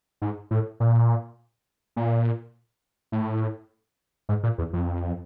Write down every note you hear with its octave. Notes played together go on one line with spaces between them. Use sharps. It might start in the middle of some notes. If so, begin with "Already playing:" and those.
G#2
A2
A#2
A#2
A2
G#2
A#2
E2
F2